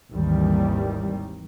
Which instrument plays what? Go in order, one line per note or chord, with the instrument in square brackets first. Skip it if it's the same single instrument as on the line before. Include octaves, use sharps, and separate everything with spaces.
[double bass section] G#1 D#2 D#3 E3 G3